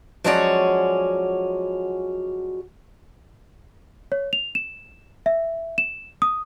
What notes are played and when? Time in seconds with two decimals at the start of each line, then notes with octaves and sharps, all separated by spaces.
0.24 F3 F#3 G#3 C#4 F#4 D5
4.12 C#5
4.33 F7
4.55 E7
5.26 E5
5.78 E7
6.22 D#6